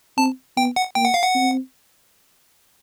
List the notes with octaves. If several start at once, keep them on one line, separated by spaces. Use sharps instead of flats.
C4 A5
B3 G5
F#5
A#3 G5
F#5
F5
F#5
C4